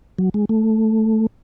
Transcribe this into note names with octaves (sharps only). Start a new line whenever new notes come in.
F#3
G#3
A3